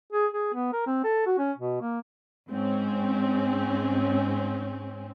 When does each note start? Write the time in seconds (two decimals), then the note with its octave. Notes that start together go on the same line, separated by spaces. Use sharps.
0.13 G#4
0.32 G#4
0.54 B3
0.72 A#4
0.86 C4
1.04 A4
1.26 F#4
1.38 C#4
1.57 B2
1.81 A#3
2.49 G#2 C4 C#4